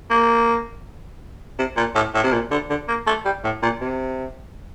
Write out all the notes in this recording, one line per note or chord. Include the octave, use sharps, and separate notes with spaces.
A#3
C3
A#2
A2
A2
C3
A#2
D3
D3
A#3
A3
G3
A2
A#2
C3